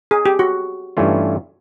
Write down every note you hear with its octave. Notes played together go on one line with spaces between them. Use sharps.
G#4
G4
F#4
G2 E3 A3 C#4 F4